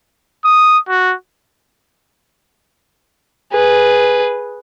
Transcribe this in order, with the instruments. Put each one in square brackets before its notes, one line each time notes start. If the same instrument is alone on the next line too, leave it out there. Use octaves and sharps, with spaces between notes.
[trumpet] D#6
F#4
[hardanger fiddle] G#4 B4